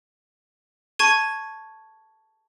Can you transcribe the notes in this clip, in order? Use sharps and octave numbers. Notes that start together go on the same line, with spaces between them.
A5 C#6 G#6 D#7